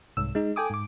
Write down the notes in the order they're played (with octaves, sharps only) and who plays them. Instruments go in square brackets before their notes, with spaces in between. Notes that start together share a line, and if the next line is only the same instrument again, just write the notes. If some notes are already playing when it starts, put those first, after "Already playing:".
[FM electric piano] C2 G#2 E6
G#3 D#4
A4 G5 G#5 D6 D#6
G#2 D6